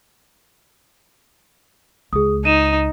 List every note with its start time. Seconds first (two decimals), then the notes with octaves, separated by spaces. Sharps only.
2.13 C#2 G#4 D#6
2.45 D#4 D#7 E7